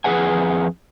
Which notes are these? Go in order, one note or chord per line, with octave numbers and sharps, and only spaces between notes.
F2 D#3 G#4 B4 F#5 G#5